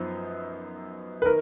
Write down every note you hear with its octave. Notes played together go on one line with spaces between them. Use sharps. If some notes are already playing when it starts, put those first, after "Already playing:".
Already playing: F#2 F3 B3 D#4
B4
D#3 A#4